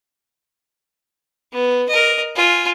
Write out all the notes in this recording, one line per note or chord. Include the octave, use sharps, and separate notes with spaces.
B3
A#4 D#5
F4 G#5